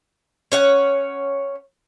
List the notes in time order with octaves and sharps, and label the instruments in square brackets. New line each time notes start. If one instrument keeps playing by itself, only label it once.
[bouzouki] C#4 C#5 F#5